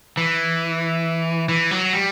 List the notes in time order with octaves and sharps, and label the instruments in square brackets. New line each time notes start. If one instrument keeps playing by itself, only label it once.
[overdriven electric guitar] E3
E3
F#3
G3